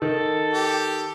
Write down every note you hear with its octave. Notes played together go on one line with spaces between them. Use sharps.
D#3 A4
G4